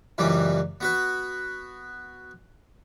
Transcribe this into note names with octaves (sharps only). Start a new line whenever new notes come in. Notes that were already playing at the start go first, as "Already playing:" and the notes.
C#2 F#2 E3 G3 C4
B3 F#4 B4